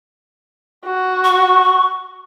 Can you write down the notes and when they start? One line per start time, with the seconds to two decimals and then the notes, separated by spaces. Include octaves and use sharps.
0.85 F#4
1.24 C#6